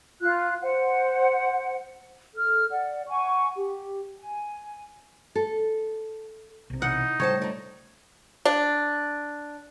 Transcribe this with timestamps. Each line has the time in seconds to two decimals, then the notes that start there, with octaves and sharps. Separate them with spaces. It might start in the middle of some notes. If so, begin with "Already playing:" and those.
0.21 F4 F#6
0.61 C5 F#5
2.37 A4 F6
2.71 D5 F#5
3.09 F#5 G#5 C#6
3.56 G4
4.19 G#5
5.35 A4
6.70 B1 C3
6.82 E3 D#4 F#5
7.20 A2 C#3 G3 A3 C5 C#5 A5
7.42 D3 D#4
8.45 D4